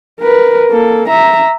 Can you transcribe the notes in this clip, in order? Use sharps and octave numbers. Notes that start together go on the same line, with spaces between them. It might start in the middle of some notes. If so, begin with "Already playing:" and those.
A#4 B4
A#3 A4
E5 A#5